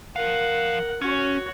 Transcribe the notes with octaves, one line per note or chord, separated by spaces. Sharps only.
F3 A#4 F5 F#5
C#4 F#4 C#5